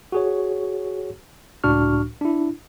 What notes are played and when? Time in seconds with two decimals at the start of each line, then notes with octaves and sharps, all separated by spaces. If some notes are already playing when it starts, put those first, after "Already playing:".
0.12 F#4 G#4 C#5
1.64 C#2 A2 D4 F#4 C#6 F6
2.21 D4 E4